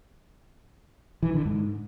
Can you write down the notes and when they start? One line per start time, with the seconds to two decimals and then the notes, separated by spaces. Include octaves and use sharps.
1.23 E3
1.34 D3
1.45 G#2